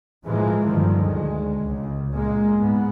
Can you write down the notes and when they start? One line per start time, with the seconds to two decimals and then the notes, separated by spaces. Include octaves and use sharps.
0.25 A2 E3 F3 G#3 A#3
0.67 G2 D3 D#3 F3
1.02 D2 G#3
1.61 C#2
2.11 A#2 G#3 A#3
2.57 G#2 B3